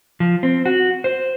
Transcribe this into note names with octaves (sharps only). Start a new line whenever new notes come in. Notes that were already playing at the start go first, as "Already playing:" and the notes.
F3
C4
F#4
C5